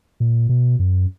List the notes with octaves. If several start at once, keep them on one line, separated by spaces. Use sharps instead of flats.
A#2
B2
F#2